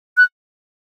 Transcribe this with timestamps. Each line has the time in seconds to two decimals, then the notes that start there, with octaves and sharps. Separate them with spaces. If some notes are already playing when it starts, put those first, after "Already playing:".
0.17 F#6